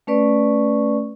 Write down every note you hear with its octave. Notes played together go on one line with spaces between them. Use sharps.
A3 C#4 B4 D5 C#6